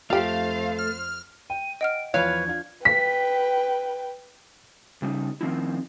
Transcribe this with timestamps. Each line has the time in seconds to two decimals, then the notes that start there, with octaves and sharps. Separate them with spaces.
0.10 F2 A3 F4 G4 C5 F5
0.79 F6
1.50 G5 D#7
1.81 D#5 F#5 F6 D7
2.14 E2 F3 B4 C#5 F5 G#6
2.47 D4 F4
2.85 B4 G5 B6
5.02 C#3 G3 D#4
5.41 D#3 F3 C4 D#4 E4